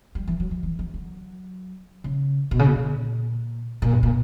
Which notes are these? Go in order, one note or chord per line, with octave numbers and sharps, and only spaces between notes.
G3
E3
F#3
F#3
E3
F#3
F#3
C#3
B2
C#3
B2
A#2
A#2
G2
A#2